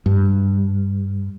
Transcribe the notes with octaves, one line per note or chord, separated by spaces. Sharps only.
G2